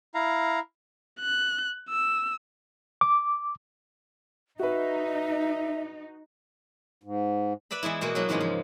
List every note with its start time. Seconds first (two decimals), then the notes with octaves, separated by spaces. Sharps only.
0.15 E4 F5 A#5
1.20 F#6
1.89 E6
3.01 D6
4.59 D#4 F#4 B4 E5
7.04 G#2
7.71 B4 D5 E5 B5
7.83 E3 G#3 B3 E4
8.01 B2 G#3 A#3 F#4
8.15 F#3 A#3 B3 D4 E4
8.29 E2 G#2 C#3 G#3 A#3 F4
8.40 F3